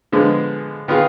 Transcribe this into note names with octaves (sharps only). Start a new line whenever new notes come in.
D3 F3 G#3 B3
D#3 B3 F4 G#4